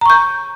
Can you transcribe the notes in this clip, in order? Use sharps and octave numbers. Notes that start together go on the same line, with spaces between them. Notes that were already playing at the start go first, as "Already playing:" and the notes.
A#5 C#6 G6